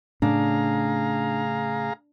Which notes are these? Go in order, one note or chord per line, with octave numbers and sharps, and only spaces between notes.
A2 C#3 D4 G#4 F5 A#5